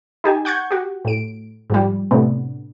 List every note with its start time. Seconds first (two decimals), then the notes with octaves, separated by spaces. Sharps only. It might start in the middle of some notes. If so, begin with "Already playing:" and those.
0.24 D#4 G4 G#5
0.45 F#5 C#6 G6 G#6
0.71 F#4 G4
1.05 A2 D7
1.70 G#2 F3 G3
2.11 A2 C3 B3 D4